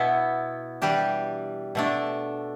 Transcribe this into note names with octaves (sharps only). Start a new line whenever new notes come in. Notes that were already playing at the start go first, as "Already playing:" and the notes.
Already playing: B2 B3 E4
E3 G3 D4 G4
B2 A3 D4